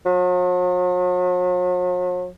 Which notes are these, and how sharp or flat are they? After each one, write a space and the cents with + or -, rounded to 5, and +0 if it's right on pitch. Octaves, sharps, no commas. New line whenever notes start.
F#3 -45